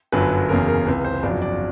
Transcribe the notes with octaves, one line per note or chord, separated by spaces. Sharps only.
G1 F#2 D3 F#3 B4
F#1 E2 C#3 F#3 A#4
A#4
C#2 C3 E3 B4
C5
G1 F2 C#3 F#3 D5
D5